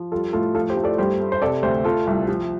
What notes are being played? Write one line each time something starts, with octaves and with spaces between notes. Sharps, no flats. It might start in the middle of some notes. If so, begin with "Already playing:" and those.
Already playing: F3
G3 F4 A4
A2 F4 A4
F3 F4 A4
G4 C5
A3
A4 D5
G2 G4 C5
A3
C5
C3 A4 D5
D2 G4 C5
A3 F4 A4
C2
F3